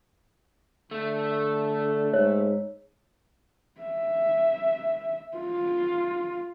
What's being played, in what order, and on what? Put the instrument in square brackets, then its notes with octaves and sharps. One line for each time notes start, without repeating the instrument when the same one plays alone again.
[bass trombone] D3 [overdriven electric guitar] A3
[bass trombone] G#2 [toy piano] C#5
[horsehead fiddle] E5
F4